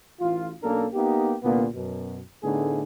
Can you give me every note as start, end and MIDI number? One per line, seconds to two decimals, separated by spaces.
0.20 0.51 33
0.20 0.51 65
0.63 0.86 35
0.63 0.86 58
0.63 0.86 61
0.63 0.86 62
0.63 0.86 69
0.63 0.86 70
0.94 1.33 58
0.94 1.33 59
0.94 1.33 63
0.94 1.33 67
1.43 1.66 36
1.43 1.66 46
1.43 1.66 50
1.43 1.66 58
1.43 1.66 59
1.74 2.19 42
1.74 2.19 47
2.42 2.81 45
2.42 2.81 50
2.42 2.81 57
2.42 2.81 59
2.42 2.81 63
2.42 2.81 68